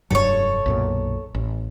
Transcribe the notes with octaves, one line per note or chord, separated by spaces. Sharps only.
F1 G2 F#3 A4 C#5
B1 F#2 A#2
A1